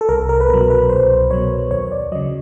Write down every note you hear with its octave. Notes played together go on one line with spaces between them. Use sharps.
A4
C2 A#4
A#4
B4
B2 F#3 A#4
B4
C2 C5
B2 F#3 C#5
D#2 C#5
D5
C#3 F#3 D#5